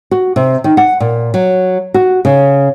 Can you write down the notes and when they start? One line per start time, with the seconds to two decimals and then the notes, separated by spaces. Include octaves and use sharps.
0.11 F#4
0.36 C3
0.64 D#3
0.77 F#5
1.00 A#2
1.34 F#3
1.94 F#4
2.25 C#3